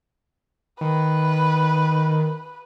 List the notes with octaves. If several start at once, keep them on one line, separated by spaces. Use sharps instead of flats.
D#3 B4